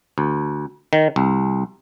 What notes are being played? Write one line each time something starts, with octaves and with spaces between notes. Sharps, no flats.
D2
D#3
C2